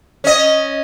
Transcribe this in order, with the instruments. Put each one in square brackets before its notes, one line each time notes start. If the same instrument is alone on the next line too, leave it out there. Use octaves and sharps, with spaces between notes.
[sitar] C#4 D#5